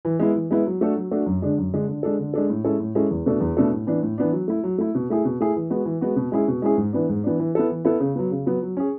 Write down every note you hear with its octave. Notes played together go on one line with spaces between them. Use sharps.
E3
G#3 B3 E4
E3
G#3 B3 E4
F#3
A3 D4 F#4 A4
F#3
A3 D4 F#4 A4
F#2
D3 G#3 D4
F#2
D3 G#3 D4
D3
G#3 D4 A4
D3
G#3 D4 A4
A2
G#3 C#4 E4 A4
A2
G#3 C#4 E4 A4
E2
B2 A3 D4 A4
E2
B2 A3 D4 A4
A2
E3 B3 D4
A2
E3 B3 D4
F#3
A3 E4
F#3
A3 E4
B2
A3 E4 G#4
B2
A3 E4 G#4
E3
G#3 B3 F#4
E3
G#3 B3 F#4
B2
G#3 C#4 E4 G#4
B2
G#3 C#4 E4 G#4
G#2
E3 B3 D4
G#2
E3 B3 D4
E3
B3 E4 A4
E3
B3 E4 A4
C#3
F#3 B3
C#3
F#3 B3
F#3
C#4 G#4